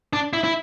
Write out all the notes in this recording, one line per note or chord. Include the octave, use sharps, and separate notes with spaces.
D4
E4
E4